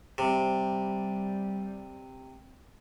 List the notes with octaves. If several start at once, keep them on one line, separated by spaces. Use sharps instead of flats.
C3 G3